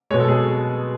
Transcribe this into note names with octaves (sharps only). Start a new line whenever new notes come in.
B2 G#3 C#5
A4
G#4